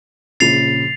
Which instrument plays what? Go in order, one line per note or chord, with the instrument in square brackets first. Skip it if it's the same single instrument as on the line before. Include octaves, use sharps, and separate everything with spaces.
[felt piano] A#1 A#2 C#3 [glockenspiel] A6 C7 F7